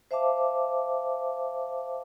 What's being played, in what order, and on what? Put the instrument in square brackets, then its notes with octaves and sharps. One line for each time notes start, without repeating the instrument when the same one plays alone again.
[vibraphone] C5 E5 F5 A5 D6